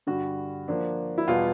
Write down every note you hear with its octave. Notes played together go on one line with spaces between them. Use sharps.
G2 D3 G3 F#4
F3 A#3 D4
E4
E2 B2 G3 F4